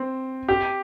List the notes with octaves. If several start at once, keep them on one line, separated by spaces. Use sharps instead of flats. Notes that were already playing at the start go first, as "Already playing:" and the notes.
Already playing: C4
G4